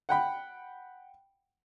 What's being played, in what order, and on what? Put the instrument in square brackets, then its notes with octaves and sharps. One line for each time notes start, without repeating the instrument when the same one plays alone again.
[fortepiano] F#5 G5 B5